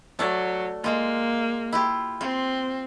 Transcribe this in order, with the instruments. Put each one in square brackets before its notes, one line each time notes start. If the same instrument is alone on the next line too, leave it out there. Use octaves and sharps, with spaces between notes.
[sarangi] F#3 [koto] A3 D5
[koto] G#3 F4 [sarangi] A#3
[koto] E4 F4 G4
[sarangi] C4 [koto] F4